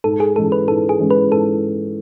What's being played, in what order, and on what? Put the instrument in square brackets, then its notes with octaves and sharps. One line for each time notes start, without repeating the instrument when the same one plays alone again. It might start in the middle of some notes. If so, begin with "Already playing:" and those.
[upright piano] G#2 [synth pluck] A4
[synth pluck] G#4
[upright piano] E3 G#3 C#4 [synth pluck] A4
[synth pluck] B4
[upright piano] G#2 [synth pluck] A4
[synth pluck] G#4
[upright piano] E3 G#3 C#4
[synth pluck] B4
[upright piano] G#2 [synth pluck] A4